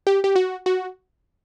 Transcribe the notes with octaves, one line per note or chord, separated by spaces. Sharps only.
G4
G4
F#4
F#4